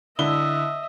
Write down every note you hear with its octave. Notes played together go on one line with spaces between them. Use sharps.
D3 E4 D#5 E5 G7